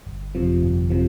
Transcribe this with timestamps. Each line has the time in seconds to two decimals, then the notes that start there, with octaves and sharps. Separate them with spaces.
0.06 G1
0.35 F2 C3 F3
0.62 G1
0.90 C3 F3